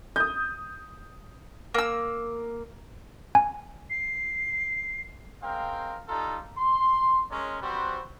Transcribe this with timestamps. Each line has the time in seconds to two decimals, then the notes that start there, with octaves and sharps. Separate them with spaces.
0.16 D#6 G6
1.74 A#3 E6
3.35 G#5
3.90 C7
5.42 G#3 C4 A#4 F5 G5
6.08 G3 D#4 F4 A4 A#5
6.57 C6
7.31 G#3 C#4 A#4 C#5 C6
7.62 G3 C4 F#4 B4 C5